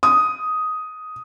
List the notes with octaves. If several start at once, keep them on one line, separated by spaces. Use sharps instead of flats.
D#6